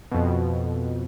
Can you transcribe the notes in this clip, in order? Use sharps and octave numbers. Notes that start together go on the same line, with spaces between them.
F2 B2